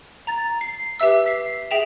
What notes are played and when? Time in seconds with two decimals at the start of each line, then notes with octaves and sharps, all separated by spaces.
0.27 A#5 A6
0.61 C7
1.00 G4 B4 E5 E6
1.26 B6 C7
1.71 G#4 E5 G5 E7 F7